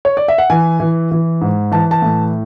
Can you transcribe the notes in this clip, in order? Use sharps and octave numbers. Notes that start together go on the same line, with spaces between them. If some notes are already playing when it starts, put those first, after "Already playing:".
C#5
D5
E5
F#5
E3 G#5
E3
E3
G#2
E3 A5
A5
A2